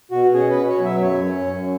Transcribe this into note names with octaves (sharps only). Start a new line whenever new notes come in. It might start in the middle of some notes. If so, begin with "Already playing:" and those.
B2 F#4
C#4 G#4
B4
B2
C#5
F#3
E5
F#2 C#5
C#4
F#2